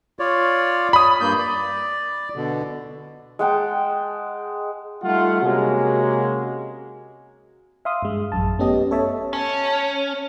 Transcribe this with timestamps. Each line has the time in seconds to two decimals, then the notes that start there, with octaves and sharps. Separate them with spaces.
0.19 F4 C#5 D5
0.93 B5 D#6
1.21 G2 A#3 G6
1.38 D5
2.36 B2 D3
3.39 G#3 F#5 G5 A5
5.03 G3 A3 D#4 F4 F#5
5.41 C3 G#3 A#3 C#4 F#4
7.85 E5 F5 C6 D#6
8.02 G2 G#3
8.32 A1 F#2 A5
8.59 A3 B3 C#4 G4 D#5
8.91 A4 C#5 E5 A5
9.33 C#4 A5